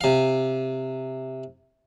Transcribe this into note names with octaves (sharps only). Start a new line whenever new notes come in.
C3 F5